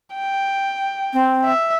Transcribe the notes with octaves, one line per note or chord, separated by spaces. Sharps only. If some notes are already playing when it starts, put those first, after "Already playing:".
G5
C4
E5